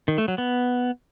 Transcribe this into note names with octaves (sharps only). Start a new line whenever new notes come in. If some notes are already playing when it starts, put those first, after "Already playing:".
D#3
A3
F#3
B3